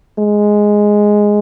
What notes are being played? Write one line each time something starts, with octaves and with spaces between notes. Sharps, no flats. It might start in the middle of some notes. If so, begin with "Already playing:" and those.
G#3